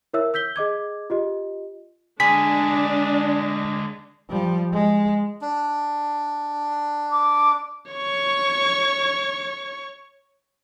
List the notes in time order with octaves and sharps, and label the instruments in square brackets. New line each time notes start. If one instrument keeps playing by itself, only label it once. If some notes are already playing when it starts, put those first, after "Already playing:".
[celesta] E4 A#4 C#5 E5 E6
E6 G6 B6 G7
G#4 D#5 D6 G#6
F4 G4 D#5
[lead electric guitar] D3 G#3 [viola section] D4 [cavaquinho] G#4 [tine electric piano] B6
[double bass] F3 G3
G#3
[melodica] D4
[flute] D6
[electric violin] C#5 C#6